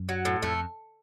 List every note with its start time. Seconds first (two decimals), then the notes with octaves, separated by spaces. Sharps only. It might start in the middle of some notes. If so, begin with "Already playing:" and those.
Already playing: F#2
0.09 F#3
0.25 A2
0.42 F2 A3